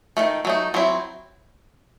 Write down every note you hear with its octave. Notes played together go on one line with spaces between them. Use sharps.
D#3 F#3 A3
F#3 A3 D#4
F#3 C4 E4